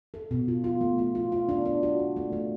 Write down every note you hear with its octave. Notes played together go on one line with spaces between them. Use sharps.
A4
B2
F4
F4
A3
F4
F4
F4
D4
D4
F#4
D4
A3
A3